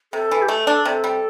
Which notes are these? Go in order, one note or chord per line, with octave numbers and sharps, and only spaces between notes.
C3 A4
E3
G4
A3 A4
D4
C3 A4
G3